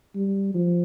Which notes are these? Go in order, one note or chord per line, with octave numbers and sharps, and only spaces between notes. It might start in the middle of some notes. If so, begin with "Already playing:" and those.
G3
F3